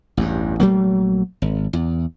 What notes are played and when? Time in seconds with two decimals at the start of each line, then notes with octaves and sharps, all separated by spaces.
0.17 A1 E2 G2
0.60 A#1 F#3 A3 A#3
1.42 G#1
1.73 E2